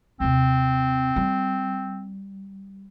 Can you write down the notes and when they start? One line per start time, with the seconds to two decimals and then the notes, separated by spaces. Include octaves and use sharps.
0.20 D#2 C3 C4
1.16 G3